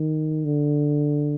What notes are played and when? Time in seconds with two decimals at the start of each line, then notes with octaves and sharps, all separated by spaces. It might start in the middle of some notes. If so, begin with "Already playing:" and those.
Already playing: D#3
0.45 D3